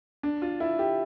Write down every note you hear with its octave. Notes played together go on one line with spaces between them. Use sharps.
D4
F4
E4
G4